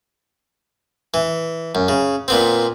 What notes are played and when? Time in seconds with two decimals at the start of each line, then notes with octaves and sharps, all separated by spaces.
1.14 E3
1.75 F#2
1.88 C#3
2.28 A#2 B3 C4